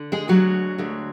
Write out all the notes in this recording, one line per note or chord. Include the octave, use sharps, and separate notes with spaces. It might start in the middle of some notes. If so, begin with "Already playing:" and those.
Already playing: D3
G#3 G#4
D2 D3 F#3 G#3 F#4
D2 D3 G#3